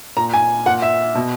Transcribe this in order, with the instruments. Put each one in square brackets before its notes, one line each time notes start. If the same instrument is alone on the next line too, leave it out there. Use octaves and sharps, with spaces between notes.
[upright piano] A#2 A#5
G#5
A#2 F#5
E5
B2